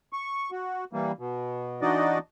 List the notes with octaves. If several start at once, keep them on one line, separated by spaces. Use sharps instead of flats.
C#6
F#4
E3 G3 A#3
B2
E3 D4 D#4 F#4 D5 D#5